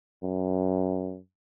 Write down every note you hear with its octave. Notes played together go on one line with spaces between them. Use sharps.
F#2